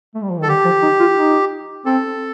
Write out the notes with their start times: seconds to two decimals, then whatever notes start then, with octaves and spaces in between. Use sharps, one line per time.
0.15 A3
0.23 G3
0.31 F3
0.39 D#3
0.43 A4
0.48 D3 G4
0.65 F3
0.82 D#4
1.00 F4
1.16 D#4
1.86 C4 A4